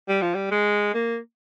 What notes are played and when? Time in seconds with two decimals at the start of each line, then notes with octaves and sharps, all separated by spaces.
0.08 G3
0.22 F3
0.34 G3
0.51 G#3
0.94 A#3